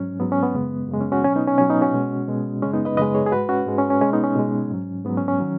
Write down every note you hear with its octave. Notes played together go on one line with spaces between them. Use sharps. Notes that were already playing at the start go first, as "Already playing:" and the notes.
Already playing: G#2 F#3 C#4
G#2 F#3 B3
C#4
B3
F#2 C#3 G#3
F#2 C#3 G#3
C#4
C#4 F#4
B2 F#3 C#4
B3 D#4
C#4
B2 F#3 C#4
B3 D#4
C#4 F#4
B2 G#3
B2 G#3
F#2 C#3 G#3 C#4
B3 D#4
B4 D#5
F#2 C#3 G#3 B4 D#5
G#4 C#5
G#4
G#2 G#3 F#4 B4
C#4 F#4
G#2 G#3
C#4
C#4
B2 G#3 C#4
B3 D#4
C#4
B2 G#3
G#2 F#3
G#2 F#3 B3
C#4
C#4
D#3 F#3